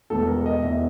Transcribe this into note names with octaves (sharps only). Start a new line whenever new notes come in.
E1 E2 B2 A4
A#4
D#5
E1 E2 B2 E5